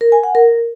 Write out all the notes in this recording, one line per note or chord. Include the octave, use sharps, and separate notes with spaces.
A#4
G#5
F#5
A#4